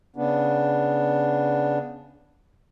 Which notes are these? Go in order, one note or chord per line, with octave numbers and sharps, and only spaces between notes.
C#3 B3 D4